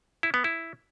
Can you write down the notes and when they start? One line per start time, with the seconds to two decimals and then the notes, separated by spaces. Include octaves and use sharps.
0.23 E4
0.34 B3
0.44 E4